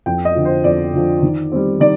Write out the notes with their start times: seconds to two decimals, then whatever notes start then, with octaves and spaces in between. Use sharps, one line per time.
0.06 F2 G5
0.25 D#5
0.35 D3 F3
0.45 C5
0.64 F2 D5
0.93 D3 F3
1.22 D#3
1.52 G3 C4
1.80 D#3 D5